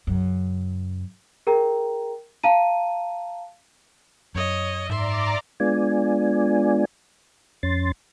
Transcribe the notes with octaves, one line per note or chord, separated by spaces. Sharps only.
F#2 C#3
G#4 A#4 G5 A#5
F5 A5 A#5 D#7
F#2 C#5 D#5
G#2 D5 E5 A#5 C6 D6
G#3 B3 D4 F4 D5 G#5
F2 C#4 C6 A6